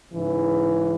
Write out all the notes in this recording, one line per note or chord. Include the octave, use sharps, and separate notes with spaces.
G#2 C#3 E3